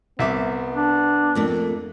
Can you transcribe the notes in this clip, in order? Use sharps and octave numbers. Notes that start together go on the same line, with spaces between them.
C2 B3 E5 D6
D4
F2 A3 A#3